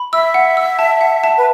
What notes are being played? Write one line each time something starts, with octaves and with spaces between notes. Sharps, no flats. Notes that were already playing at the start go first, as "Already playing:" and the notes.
Already playing: B5
E5 E6
F#5
E6
A5
F#5
A5
B4